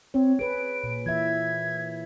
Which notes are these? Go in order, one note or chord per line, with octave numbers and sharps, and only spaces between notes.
C4 C#5
G#4 B4 D7
A#2
E3 E5 G#6